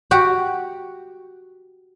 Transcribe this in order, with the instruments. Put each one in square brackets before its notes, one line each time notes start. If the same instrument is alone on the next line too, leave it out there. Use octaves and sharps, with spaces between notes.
[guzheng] F#4 G4